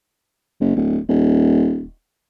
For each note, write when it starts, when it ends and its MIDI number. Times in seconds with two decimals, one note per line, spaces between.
0.60 0.72 30
0.76 0.98 26
1.09 1.87 27